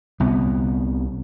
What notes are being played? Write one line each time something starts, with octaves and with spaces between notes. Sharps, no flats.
C2 C3 B3